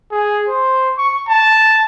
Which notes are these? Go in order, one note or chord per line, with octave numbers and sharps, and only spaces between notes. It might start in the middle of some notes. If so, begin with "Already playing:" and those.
G#4
C5
C#6
A5